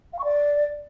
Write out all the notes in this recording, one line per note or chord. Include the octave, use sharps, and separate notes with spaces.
F5
C#6
D5